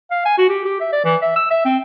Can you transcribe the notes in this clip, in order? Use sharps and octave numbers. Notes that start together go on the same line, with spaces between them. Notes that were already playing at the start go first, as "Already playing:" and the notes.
F5
G#5
F#4
G4
G4
E5
D5
E3
E5
E6
E5
C4